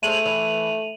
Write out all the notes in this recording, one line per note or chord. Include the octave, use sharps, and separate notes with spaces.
G#3 A3 A4 C5 D#7 F7 F#7
E3